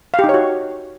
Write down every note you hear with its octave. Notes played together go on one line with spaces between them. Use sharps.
F5
G4
D#4
C#5
F#4